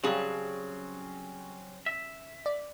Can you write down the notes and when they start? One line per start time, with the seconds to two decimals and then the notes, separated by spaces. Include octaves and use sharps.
0.04 C#3 F#3 G3 C4 C#4 G#4 F#5 A5
1.86 E5
2.46 D5